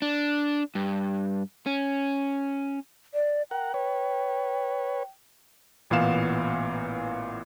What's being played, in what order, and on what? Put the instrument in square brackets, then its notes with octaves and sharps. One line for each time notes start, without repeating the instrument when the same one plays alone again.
[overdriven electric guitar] D4
G2
C#4
[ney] D5
[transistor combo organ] A#4 F#5 [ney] G5
[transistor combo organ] B4 C#5
[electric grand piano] A1 A#2 E3 B3 F5 E7